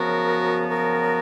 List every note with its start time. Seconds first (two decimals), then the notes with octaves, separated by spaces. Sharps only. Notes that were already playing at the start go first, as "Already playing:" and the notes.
Already playing: F#2 C#3 F3 B3 F#4 A#4
0.68 F#4 A#4